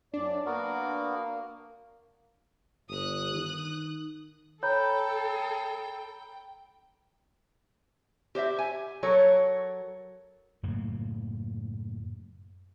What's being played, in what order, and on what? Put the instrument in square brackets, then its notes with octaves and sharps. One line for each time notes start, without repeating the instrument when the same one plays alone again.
[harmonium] F#2 D5 [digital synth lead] D4
[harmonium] A#3 [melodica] B3 F#4 A#4
[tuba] G1 [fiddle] D#6 F#6
[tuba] D#3
[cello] A4 [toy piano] C#5 [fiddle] G5 [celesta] A#5 B5
[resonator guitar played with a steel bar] G4 C5 D#5 E5
G#5
F#3 A4 A#4 C#5
[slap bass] F#2 A2 C#3 A#3